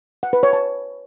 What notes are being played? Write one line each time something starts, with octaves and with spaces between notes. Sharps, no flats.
F#5
B4
C#5
A5